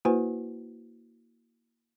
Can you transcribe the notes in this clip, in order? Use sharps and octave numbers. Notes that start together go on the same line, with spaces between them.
A#3 E4 F#4 B4 C5 G#5